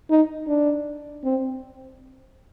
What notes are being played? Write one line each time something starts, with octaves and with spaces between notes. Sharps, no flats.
D#4
D4
C4